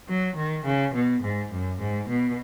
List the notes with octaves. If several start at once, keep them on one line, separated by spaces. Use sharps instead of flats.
F#3
D#3
C#3
B2
G#2
F#2
G#2
B2